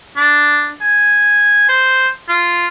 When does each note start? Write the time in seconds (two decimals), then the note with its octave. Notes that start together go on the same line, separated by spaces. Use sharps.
0.17 D4
0.81 G#5
1.69 C5
2.29 F4